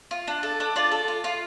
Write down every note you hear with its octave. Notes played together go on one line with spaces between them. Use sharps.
F4
D4
A4
D4
F4 D5
A4
F4
F4